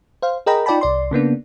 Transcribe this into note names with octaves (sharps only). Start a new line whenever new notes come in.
C5 F5
G#4 A#4 D#5 G5 A#5 B5
D#4 F4 D5 G5 A5 B5
C2 D5 C6
C#3 A#3 B3 D4